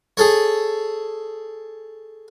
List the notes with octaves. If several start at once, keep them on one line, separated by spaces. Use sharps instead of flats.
G#4 A4 C#5